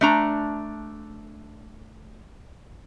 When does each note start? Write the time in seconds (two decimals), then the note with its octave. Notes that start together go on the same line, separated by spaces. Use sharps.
0.01 A3 D4 A#5